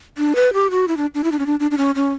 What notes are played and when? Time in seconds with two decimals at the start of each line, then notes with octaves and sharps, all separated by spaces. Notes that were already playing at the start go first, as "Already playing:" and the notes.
0.18 D4
0.36 B4
0.53 G4
0.71 F#4
0.88 E4
0.97 D4
1.15 D4
1.24 E4
1.32 D4
1.39 C#4
1.46 D4
1.60 D4
1.71 D4
1.78 C#4
1.95 C#4